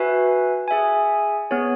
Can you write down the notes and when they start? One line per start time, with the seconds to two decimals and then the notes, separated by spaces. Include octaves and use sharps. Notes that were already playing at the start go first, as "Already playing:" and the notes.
Already playing: F#4 B4 E5 G#5
0.68 G#4 E5 G#5
1.51 B3 G#4 C#5